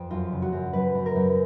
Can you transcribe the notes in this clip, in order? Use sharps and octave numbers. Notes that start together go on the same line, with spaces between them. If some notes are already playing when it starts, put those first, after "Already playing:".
Already playing: F2
F#2 F4
C#3
F#4
F#2
F#2 B4
F#2
A#4
F#2